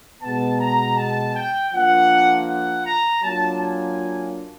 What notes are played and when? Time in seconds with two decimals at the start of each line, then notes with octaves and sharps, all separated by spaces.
0.22 B2 G#3 B3 A5
0.60 A#5
0.98 A5
1.35 G5
1.73 F3 A#3 D4 F4 F#5
2.48 F#5
2.85 A#5
3.23 F#3 A#3 D4 F4 A5
3.61 G#5